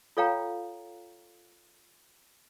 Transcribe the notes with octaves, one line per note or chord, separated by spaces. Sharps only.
F4 A4 C#5 F5 G5 A#5